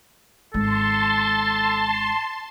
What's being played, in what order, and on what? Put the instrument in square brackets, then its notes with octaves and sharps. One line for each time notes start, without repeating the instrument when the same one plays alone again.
[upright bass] G#1 G#3 [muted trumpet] A4 [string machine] A5 C6